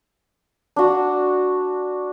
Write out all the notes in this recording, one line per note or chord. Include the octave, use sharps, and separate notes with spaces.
D4 F#4